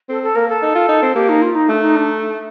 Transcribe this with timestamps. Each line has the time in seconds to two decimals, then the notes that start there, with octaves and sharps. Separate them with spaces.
0.09 C4 A4
0.23 A4
0.35 A#3 A#4
0.48 A4
0.62 D#4
0.75 F4
0.89 D#4
1.02 C4
1.15 A#3 G4
1.29 D#4
1.42 F4
1.55 D#4
1.68 A3 D4
1.81 D#4
1.95 D4